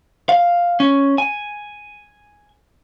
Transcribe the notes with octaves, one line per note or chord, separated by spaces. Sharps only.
F5
C#4
G#5